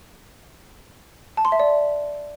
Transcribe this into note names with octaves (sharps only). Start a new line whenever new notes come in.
A5
C6
E5
D5